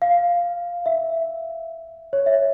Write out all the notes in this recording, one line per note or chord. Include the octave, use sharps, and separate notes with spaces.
F5
E5
C#5
E5